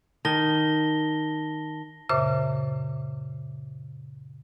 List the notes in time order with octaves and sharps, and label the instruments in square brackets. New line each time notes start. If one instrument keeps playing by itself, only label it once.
[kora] D#3 [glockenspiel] A5 A#6 G7
[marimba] F#2 A#2 C#3 C5 E5 D6